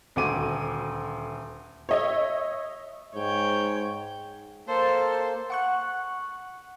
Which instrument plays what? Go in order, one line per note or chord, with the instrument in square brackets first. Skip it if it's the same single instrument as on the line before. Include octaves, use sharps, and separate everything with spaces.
[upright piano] D#1 D2 F#4 D6 D#7
[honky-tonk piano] C#5 D#5 E5
[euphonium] G#2 [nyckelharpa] C#5 G5
[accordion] A#3 A4 [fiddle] C5
[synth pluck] F#5 C#6 F#6